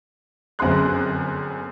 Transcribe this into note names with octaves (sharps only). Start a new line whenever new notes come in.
G1 F#2 C4 G#4 C6 F#6